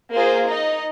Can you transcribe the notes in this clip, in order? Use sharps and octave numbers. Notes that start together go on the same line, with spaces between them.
A#3 F4 G#4 C5
D#4 D#5